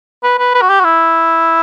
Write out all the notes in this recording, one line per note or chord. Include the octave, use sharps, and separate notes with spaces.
B4
B4
B4
F#4
G4
F#4
E4